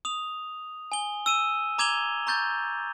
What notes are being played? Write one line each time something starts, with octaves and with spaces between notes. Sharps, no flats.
D#6 F7
G#5 G7
E6 D#7 E7
A#5 D6 G#6 E7 F7 G7
A#5 C#6 G6 A6